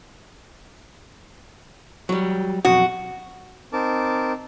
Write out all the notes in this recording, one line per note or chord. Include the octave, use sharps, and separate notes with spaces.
F#3 G3
F2 B2 F#3 F#4
C4 D#4 A#4 A5 D6